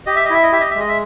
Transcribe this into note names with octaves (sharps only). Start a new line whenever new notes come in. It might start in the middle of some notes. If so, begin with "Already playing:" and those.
G4 D#5
E5
D#5
E4 E5
D#5
G4 E5
D#5
E5
G#3 D#5
E5